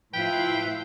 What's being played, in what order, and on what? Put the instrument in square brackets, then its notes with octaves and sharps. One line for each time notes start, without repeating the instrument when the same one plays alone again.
[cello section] A2 E4 F5 [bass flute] F3 [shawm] B4 [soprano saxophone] G5